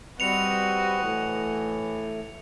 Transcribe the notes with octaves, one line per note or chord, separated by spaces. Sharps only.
G3 C4 F#4 B4 D#5 C#7 F7
A2 E3